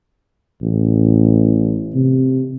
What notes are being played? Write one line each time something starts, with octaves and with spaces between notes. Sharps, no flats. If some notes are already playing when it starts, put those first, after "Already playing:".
A1
C3